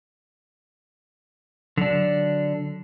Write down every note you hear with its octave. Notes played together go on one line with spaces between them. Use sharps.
D3 F#3 D4